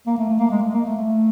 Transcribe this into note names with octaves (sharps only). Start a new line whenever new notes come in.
A#3
A3
A3
A#3
G#3
A3
A#3
A3
A3